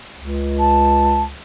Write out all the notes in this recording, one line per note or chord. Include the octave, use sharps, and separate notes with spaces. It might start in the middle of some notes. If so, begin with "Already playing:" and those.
C#2
A5